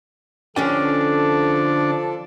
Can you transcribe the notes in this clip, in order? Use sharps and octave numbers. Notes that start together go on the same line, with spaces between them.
D3 F3 C#4 D4 A4 G5